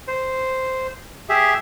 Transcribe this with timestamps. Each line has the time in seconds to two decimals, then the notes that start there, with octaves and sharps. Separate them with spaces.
0.08 C5
1.29 G4 G#4 E5